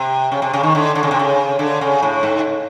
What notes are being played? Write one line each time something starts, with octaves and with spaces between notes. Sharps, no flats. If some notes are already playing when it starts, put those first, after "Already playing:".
Already playing: C3
C#3
C3
C#3
D#3
D3
D3
C#3
C3
C#3
D3
C#3
A2
G#2